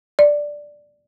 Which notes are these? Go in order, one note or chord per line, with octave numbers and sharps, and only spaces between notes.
D5